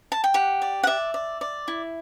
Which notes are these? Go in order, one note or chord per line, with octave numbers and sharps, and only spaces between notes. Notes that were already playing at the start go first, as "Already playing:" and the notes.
A5
G5
G4 F#5
D5
F#5
D5 E5
D5
D5
E4